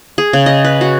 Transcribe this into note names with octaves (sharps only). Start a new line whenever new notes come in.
G#4
C#3
D#5
B4
F#4